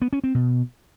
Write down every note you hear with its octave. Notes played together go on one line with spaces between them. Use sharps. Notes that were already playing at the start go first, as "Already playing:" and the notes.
B3
C#4
C4
B2